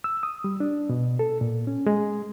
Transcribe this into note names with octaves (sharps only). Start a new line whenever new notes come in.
E6
D#6
G3
D4
B2
A4
A#2
C#4
G#3